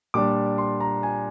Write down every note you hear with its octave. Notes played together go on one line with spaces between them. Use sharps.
A#2 G3 D4 D6
C6
A#5
G#5